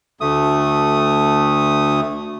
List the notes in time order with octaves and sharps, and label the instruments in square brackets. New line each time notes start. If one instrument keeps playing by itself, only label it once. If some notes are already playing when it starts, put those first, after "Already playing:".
[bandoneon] D2 A3 D#6